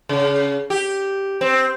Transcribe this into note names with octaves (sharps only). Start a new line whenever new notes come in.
C#3
G4
C4